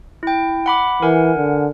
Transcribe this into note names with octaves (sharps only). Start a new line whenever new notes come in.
E4 G5
F#5 B5 D6
E3 A#4 F#5 G#5
D3